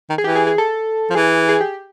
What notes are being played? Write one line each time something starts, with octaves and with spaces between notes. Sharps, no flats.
D#3
G#4
E3 G4
G#4
G#4
A4
F3
E3 G#4
G#4
G4